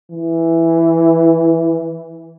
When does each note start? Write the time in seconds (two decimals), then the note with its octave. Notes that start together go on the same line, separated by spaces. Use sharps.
0.11 E3